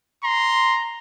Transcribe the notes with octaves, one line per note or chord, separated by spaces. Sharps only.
A#5 C6